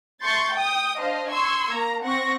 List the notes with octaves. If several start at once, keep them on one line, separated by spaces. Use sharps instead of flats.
A3 C6 C#6 G6 A6
G5 D#6
D4 C5 D#5 F5
C6 C#6 E6 G#6
A#3 A#5
C4 F#5 C#6 A#6